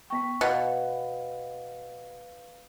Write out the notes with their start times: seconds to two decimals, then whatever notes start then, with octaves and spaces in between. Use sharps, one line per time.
0.10 B3 G5 C#6 B6
0.41 B2 B4 F5